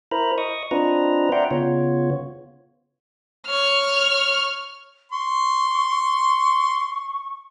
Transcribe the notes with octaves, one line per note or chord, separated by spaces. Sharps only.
E4 A#4 C5 A#5 B5
D#5 C#6 D#6
C4 D4 F4 B4 D#5 A#5
D5 E5 F#5 G5 A#5 C6
C#3 B3 F4 C#5
C#5 F6
C6 C#6